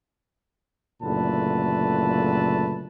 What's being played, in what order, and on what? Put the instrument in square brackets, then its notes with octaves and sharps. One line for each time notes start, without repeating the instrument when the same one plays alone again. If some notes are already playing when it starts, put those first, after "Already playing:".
[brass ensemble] F#1 A#2 D3 A3 B4 A5